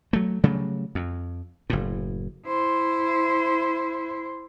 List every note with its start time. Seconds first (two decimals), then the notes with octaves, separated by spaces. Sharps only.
0.13 F#3 A3
0.44 C#3 F#3 G3 A3
0.95 F2
1.70 F#1 A2
2.46 E4 C5